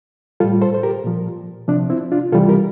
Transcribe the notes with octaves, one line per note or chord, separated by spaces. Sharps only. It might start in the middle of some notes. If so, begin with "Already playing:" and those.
A2 G3 F4 A4
A4 C5
C5
G4 A#4
A#2 F3
C3 F3 D4
C4 E4
D4 F4
C3 E3 G3 F4 A4
G4 A#4